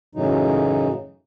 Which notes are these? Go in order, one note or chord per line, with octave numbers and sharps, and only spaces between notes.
F#2 A2 C#3 E3 F#3 D#4